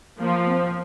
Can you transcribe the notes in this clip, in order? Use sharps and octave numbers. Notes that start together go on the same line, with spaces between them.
F3 A#3
C4